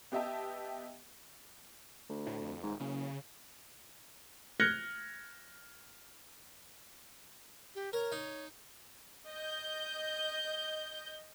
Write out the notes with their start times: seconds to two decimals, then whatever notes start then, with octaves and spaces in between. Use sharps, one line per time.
0.12 B3 G4 D#5 E5 G5 A5
2.10 D2
2.26 A2
2.41 F2
2.63 D#1 G#2
2.80 F#1 C#3
4.60 F6 F#6 G#6 A#6 C#7 G7
7.75 G4
7.93 A#4 C#5
8.12 D#4
9.28 D#5 G6